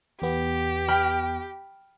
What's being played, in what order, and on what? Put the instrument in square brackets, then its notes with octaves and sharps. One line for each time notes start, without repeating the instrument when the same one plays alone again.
[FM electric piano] E2 B3 [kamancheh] G4
[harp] G5 B5 F6